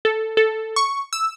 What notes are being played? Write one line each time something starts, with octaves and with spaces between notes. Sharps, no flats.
A4
A4
C#6
E6